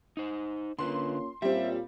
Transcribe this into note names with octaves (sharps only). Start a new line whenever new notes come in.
D#4 C5
D3 A#3 C#4 F4 B4 C6
A#2 G3 C4 C#4 F4 E5